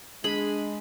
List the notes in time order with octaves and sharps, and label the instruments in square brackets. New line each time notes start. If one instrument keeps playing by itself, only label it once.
[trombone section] G#3 [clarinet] D4 [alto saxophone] G#4 [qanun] B5